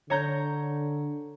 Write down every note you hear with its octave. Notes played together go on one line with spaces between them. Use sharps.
D3 C#5 A#5 G6